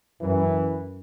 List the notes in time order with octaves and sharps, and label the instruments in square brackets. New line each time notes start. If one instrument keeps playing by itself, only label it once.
[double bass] F#2 [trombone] E3